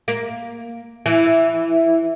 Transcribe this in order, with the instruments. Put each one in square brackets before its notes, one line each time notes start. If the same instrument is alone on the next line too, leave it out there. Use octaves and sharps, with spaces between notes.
[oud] A#3
E3